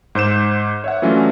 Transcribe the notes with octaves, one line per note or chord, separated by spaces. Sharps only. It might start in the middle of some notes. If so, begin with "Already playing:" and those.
G#2 C5 G6 E7
C#5 E5 F#5
E3 F#3 A3 C#4 D4 F4